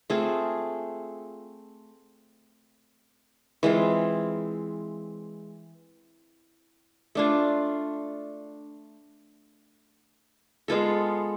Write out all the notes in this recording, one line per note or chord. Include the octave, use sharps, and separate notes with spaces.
A3 C4 F4 G#4
E3 G#3 C4 F4
A3 D4 F4
G#3 B3 F4 A4